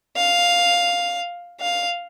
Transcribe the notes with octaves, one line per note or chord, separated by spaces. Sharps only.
F5
F5